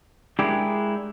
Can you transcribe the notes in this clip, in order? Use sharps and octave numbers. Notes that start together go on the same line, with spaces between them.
G#3 D4 E4 G4 G#4 A#4